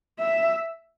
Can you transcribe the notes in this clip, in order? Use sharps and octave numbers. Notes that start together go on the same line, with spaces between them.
E5